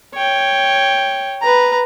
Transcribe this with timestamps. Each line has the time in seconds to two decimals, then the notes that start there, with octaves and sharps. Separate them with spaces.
0.14 C#5 G5
1.42 B4 A#5